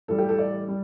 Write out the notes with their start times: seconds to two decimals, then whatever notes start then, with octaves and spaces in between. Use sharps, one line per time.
0.08 A2 E3 G3 A4
0.18 G4
0.29 A4
0.39 D5
0.68 G3